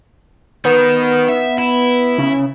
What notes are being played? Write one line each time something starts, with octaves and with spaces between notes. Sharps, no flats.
D#3 B3
E5
E4
C#3